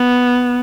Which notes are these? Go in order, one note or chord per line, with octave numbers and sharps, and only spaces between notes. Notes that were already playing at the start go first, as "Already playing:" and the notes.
Already playing: B3